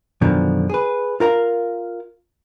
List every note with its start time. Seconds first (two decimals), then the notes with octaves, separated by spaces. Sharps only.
0.21 F#2 B2 D3 D#3 F3
0.69 G#4 B4
1.20 F4 A#4 F5 A#5